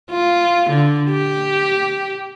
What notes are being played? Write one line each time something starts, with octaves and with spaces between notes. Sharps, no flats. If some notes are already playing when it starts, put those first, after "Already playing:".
F4
D3
G4